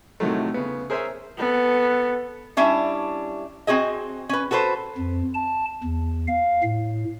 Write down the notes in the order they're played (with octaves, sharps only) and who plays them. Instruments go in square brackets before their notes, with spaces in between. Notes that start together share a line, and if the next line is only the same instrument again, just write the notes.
[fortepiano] A2 C3 D#3 F#3 A3
C#3 B3
G#4 A#4 C5 C#5 E5 G#5
[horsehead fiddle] B3 A4
[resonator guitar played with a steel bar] G3 C#4 D4 E4 E5
C4 F#4 G#4 D#5
C#4 B4
F#4 A4 B4 C5
[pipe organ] F2
A5
E2
F5
A2